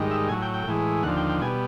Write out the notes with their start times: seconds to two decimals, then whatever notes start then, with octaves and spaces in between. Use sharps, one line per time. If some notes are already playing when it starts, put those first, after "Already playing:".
Already playing: G#2 D#3 G3
0.11 E5
0.29 A2 F#3 G#5
0.42 G5
0.54 G5
0.67 A2 E3 G#3
1.03 D#2 D3 F3 F#5
1.16 G5
1.29 G5
1.41 B2 G3 G#5